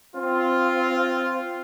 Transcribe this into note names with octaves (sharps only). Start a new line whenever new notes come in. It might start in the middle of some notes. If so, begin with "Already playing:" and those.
C4 F4